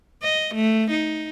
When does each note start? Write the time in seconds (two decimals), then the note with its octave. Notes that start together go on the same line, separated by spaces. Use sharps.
0.23 D#5
0.55 A3
0.91 D#4